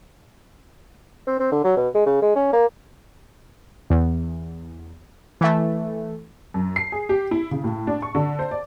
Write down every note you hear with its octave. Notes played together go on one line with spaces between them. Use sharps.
C4
C4
D3
F#3
B2
G#3
C#3
G#3
C#4
A#3
E2
E3 A3
F#2
C7
G#4
G4
E4
C#3
A2
D4
C#6
D3
C5
D5